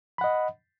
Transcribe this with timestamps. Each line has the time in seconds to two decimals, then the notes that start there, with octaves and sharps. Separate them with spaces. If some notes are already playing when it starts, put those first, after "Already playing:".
0.18 B5
0.21 F#5
0.24 D#5